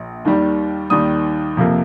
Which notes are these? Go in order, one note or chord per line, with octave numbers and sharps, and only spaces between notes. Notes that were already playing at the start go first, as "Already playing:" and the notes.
Already playing: A#1
D#2 D#3 G3
D#2 D#3 G3 D#6
F2 C3 F3 A#3